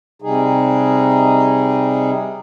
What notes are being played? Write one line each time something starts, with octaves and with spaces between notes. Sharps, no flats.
C3 G3 D#4 G#4